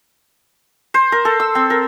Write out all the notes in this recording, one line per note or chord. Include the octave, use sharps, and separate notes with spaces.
C5
A#4
A4
E6
C4
A#4